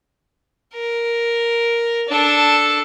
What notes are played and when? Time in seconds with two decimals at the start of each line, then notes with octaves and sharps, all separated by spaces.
0.73 A#4
2.08 D4 A4